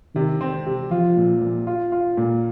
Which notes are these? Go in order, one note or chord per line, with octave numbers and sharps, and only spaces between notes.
C3 D#3
C4
C3
F3 F4
A#2
A#2
F4
F4
A#2